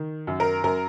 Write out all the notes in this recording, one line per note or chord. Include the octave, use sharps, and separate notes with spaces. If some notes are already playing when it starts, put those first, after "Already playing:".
Already playing: D#3
F#2
A#4
F#2 A#4